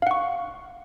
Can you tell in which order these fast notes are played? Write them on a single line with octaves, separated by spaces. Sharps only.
F5 F#5 C#6